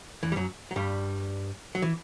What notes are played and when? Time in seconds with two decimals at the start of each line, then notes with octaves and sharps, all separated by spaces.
0.23 E2 E3
0.32 G3
0.36 F#2 F#3
0.71 F#3
0.76 G2 G3
1.75 F#3
1.82 E3